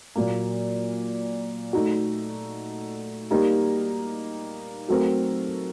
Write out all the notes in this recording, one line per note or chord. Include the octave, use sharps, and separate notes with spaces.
A#2 F#3 A#3
A3 D#4 F#4
G3 A#3 D#4 G4 A#4
F#3 A3 C4 F#4 A#4